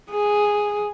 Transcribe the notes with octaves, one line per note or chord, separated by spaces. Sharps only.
G#4